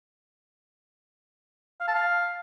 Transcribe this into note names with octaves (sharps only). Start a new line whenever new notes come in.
F5
A5
F5